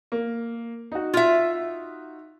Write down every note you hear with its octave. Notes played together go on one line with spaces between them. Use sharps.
A#3
D#4 F#4
F4 E5